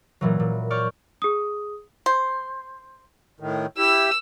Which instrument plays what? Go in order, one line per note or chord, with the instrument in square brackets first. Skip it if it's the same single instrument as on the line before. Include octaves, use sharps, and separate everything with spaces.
[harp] A#2 E3 F#3
A#2
C#5 D5 C#6 F6 G6
[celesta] G#4 D#6
[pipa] C5
[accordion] A2 D#3
[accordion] E4 G4 [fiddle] E6